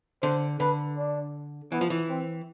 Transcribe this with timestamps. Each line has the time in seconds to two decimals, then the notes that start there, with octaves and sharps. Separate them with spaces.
0.23 D3 C5
0.60 D3 B4
0.98 D4
1.72 E3 B3
1.81 F3
1.90 E3
2.09 C4